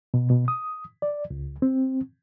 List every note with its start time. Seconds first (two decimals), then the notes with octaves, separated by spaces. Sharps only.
0.14 B2
0.30 B2
0.48 D#6
1.02 D5
1.31 C#2
1.62 C4